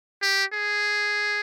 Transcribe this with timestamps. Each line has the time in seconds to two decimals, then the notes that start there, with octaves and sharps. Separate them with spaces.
0.22 G4
0.53 G#4